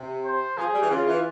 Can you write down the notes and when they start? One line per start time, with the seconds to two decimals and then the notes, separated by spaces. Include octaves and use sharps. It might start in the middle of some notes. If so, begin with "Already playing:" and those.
Already playing: C3
0.25 C5
0.57 F3 G#4
0.74 G3
0.82 E3
0.91 C#3 F4
1.07 E3